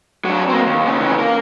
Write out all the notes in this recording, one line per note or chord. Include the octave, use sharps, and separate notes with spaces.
F#3 D4
A#3 C4
D#2
A#2 C#3
C#3 E3
A#3 A#4